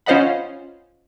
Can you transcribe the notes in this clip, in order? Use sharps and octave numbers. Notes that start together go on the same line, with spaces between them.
C#4 F4 C5 D#5 F#5 B5